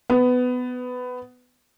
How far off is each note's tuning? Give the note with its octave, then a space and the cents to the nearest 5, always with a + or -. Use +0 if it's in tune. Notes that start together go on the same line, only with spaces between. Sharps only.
B3 +15